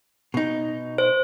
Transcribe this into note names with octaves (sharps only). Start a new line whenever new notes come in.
B2 D#4
C5